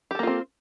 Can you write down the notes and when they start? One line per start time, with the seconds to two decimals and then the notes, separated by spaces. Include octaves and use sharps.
0.11 G4
0.15 A4
0.19 A#3
0.23 F4
0.27 C4